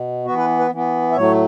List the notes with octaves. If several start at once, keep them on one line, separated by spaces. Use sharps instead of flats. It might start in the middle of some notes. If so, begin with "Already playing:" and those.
Already playing: B2
E3 B3 F#4
B4
B4
E3 B3
E5
A2 F#3 A3 C#5